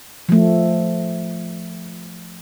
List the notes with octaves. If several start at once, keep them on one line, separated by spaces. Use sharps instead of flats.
F3 A3